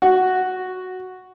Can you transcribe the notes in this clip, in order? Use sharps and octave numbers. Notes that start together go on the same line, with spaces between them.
F#4